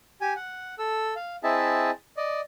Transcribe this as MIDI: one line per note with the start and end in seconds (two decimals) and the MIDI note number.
0.21 0.33 67
0.21 0.33 80
0.36 0.75 78
0.79 1.14 69
0.79 1.14 88
1.16 1.36 77
1.44 1.91 60
1.44 1.91 64
1.44 1.91 68
1.44 1.91 75
1.44 1.91 76
1.44 1.91 81
2.17 2.41 74
2.17 2.41 75